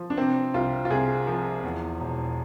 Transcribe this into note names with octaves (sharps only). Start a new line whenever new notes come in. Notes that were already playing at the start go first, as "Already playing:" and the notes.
Already playing: F3
D4
C3 C4
C2 F4
F4
C2 G#4
F3
E2
E1